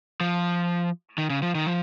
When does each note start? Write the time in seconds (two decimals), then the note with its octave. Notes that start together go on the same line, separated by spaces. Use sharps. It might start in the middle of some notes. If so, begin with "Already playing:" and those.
0.21 F3
1.18 D#3
1.30 C#3
1.42 F3
1.55 D#3
1.67 F3